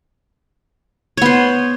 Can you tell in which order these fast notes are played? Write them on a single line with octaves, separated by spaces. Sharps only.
C#5 B3 C5